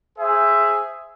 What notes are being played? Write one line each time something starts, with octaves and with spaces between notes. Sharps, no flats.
G#4 C5 E5